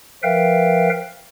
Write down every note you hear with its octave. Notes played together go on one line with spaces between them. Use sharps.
F3 A#4 B4 E5 F5 G5